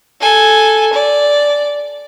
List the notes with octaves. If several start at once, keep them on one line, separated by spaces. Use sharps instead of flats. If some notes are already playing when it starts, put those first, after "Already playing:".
A4 G#5
D5